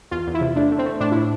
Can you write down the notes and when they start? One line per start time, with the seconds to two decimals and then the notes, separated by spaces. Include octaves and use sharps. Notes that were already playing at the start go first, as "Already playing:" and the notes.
0.11 E2 F4
0.27 E2
0.34 E4
0.41 C3
0.56 A3 D4
0.71 A3
0.79 C4
0.86 A3
1.00 A2 D4
1.12 A2 E4